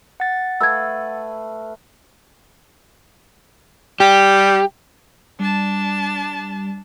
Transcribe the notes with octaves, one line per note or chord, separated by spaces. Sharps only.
F#5 A6
A3 B4 F5 E6 G#6
G3 G4
G3 D4 A5